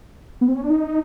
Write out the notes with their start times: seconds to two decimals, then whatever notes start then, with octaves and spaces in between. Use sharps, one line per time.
0.41 B3
0.48 C4
0.55 C#4
0.63 D4
0.70 D#4